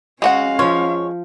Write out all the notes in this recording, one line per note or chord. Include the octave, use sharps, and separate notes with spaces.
G#3 C#4 F#4 F5 F#5
F3 F4 C#5